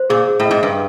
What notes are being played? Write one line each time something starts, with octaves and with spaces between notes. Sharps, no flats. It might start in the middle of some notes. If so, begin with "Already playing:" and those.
Already playing: C5
A#2 G#4
G#4
A2
D#5
G#2
G2 B4